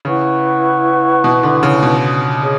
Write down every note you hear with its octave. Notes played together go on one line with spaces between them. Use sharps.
C#3 E4 B4 F#5 C#6
B2
D3
C#3
B2
G#4 C#5